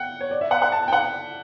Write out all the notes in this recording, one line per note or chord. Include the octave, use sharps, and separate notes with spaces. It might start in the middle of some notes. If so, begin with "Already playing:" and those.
Already playing: F#5 G5
C#5
D5
E5
F#5
F#5
A5
G5
F#5